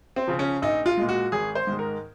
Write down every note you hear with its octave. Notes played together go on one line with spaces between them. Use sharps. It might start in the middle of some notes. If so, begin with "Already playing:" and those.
C4
C#3 F3
C#4
A#1 D#4
F4
A#2 G#3
F#4
G#1 G#4
C5
G#2 D#3 G#3
A#4